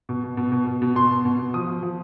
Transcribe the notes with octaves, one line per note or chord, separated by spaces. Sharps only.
B2
B2
B2
B2
B2
B2
B2 C6
B2
B2
B2
F3 D#6
F3
F3